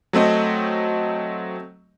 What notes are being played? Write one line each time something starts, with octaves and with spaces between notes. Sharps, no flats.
F#3 A3 C4 D#5